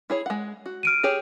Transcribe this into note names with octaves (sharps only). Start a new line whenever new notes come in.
E4 G#4 C#5
G#3 F#5
F#4
F6 D7 D#7
G4 G#4 C#5